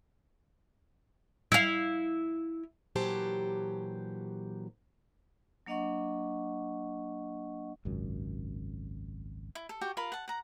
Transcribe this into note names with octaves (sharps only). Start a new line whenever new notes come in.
E4 F5
A#2 E3 F#3 G4 C5 A5
F#3 A#3 D4 D#5 F#5 C#6
G#1 C#2 F#2
E4
A4
F#4 G4 G5 C#6
F4 A#4 F5 B5
F#5 A5
F#5 A#5